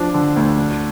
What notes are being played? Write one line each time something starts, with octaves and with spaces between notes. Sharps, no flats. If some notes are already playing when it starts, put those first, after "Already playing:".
Already playing: F3 D4
D3
D2
D4